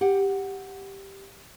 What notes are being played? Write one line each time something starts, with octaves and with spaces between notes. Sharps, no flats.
G4 F#5